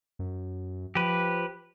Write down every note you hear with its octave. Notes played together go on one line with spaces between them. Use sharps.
F#2
F3 G4 B4